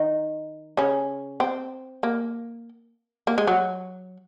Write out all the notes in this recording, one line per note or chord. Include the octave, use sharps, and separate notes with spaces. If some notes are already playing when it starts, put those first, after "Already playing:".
Already playing: D#3 D#4
C#3 C#4
C4
A#3
A#3
G#3
F#3